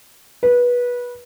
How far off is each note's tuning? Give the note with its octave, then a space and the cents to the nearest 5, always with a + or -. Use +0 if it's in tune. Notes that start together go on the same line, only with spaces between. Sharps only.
B4 -20